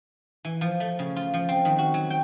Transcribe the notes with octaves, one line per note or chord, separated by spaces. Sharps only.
E3
F3
A3
C#3
F4
F3
C4
D#3
F#4
F#3
G5